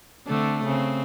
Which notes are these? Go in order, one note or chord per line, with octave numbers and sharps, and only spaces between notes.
D3 A3 C4
C#3 C4